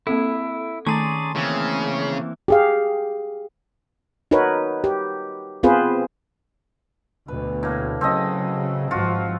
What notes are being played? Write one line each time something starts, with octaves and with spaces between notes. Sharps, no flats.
A#3 C4 E4 A4
D#3 A3 C#4 G#4 D5 A5 A#5 C6
C#3 E3 A#3 C4
G4 G#4 F5
D#4 F#4 A#4 B4 C#5
G4
B3 C4 F4 G#4 B4 C5
D2 B2 B4
A2 A#3
C#3 F#3 C4 A4 D#5
G#1 F3 F4 F#4